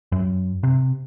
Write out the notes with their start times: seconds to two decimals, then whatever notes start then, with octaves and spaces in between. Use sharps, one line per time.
0.12 F#2
0.63 C3